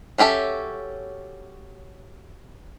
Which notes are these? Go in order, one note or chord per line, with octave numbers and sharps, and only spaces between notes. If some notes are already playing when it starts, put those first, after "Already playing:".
F#3 C#4 G4 A4 E5